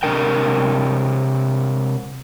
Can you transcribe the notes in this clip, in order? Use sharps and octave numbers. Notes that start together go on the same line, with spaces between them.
C3 F3 D4 A#4 G5